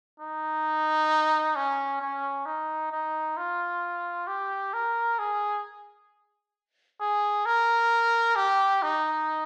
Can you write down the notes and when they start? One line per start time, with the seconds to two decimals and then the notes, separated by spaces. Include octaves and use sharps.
0.20 D#4
1.56 C#4
2.02 C#4
2.46 D#4
2.92 D#4
3.37 F4
4.27 G4
4.74 A#4
5.19 G#4
7.00 G#4
7.46 A#4
8.36 G4
8.82 D#4